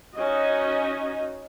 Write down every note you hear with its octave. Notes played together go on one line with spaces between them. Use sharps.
C#4 D#4 F#4 D#5